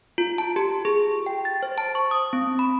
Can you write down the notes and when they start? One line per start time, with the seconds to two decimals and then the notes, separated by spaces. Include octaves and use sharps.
0.18 F4
0.38 A5
0.56 G4
0.85 G#4
1.26 G5
1.45 A6
1.63 C5
1.78 A5
1.95 C#6
2.11 D#6
2.33 C4
2.59 B5